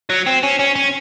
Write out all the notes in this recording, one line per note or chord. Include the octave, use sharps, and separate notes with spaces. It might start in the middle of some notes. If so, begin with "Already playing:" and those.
F#3
C4
C#4
C#4
C#4